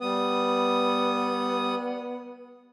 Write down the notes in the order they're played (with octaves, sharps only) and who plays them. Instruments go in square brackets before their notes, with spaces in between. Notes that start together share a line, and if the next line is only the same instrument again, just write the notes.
[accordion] G3 D#6 [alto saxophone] B3